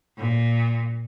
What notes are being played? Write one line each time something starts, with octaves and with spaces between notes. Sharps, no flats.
A#2